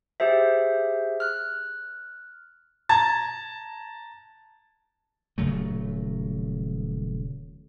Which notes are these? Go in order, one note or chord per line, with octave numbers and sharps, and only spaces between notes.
G4 G#4 C5 E5
F6 F#6
A5 A#5 G#6 A6
D#1 C#3 F#3 A3